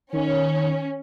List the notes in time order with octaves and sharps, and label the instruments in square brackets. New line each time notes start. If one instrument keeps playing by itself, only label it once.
[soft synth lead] D#3 [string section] C#4